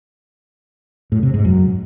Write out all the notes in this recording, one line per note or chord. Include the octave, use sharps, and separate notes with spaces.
A2
C3
G#2
F#2